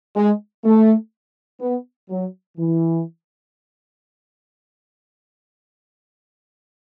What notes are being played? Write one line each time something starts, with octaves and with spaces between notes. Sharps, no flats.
G#3
A3
B3
F#3
E3